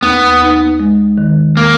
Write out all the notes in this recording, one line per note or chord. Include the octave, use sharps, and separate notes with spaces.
D#2 B3
D#4
G#3
D#3
A#3